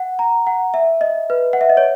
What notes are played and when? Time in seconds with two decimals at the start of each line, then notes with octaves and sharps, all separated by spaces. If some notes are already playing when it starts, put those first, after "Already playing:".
Already playing: F#5
0.19 A#5
0.47 F#5
0.74 E5
1.01 D#5
1.30 B4
1.53 F#5
1.61 E5
1.69 D#5
1.77 C#5